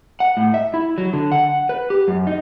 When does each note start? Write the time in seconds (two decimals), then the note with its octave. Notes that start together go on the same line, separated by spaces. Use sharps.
0.20 F#5
0.37 A2
0.54 E5
0.74 E4
0.98 F#3
1.13 D3
1.32 F#5
1.69 B4
1.90 G4
2.08 F#2
2.27 D#4